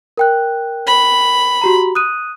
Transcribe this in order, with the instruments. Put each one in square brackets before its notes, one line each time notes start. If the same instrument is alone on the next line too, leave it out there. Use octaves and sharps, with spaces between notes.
[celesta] A#4 G5 F#6
[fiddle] B5
[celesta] F#4 G4 A#5
D#6 F#6 D#7